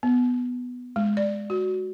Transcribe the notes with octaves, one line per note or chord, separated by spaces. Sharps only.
B3
G#3
D5
F#4